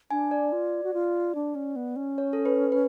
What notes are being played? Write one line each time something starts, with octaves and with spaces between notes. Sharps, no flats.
D4 G#5
D5
F4
F#4
F4
D4
C#4
B3
C#4
C#5
A4
B4
B4